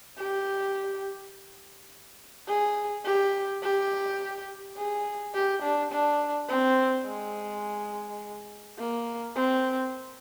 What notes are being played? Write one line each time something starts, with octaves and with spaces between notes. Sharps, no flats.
G4
G#4
G4
G4
G#4
G4
D4
D4
C4
G#3
A#3
C4